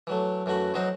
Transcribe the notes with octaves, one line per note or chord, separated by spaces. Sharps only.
E3 F#3 A3
F#2 E3 A3 F#4 B5
E3 F#3 D#4 F#4 C5